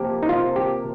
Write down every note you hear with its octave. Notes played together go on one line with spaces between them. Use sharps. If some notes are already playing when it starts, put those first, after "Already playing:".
Already playing: C3 F3 A#3 G4
D#4
F4
G4